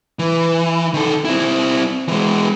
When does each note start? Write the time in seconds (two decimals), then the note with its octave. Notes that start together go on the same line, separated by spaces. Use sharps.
0.19 E3
0.94 D#3 A4
1.25 C4 E4
2.08 E3 G#3